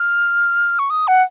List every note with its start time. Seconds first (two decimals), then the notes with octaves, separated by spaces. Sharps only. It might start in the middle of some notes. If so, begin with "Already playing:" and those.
Already playing: F6
0.79 C#6
0.90 D#6
1.08 F#5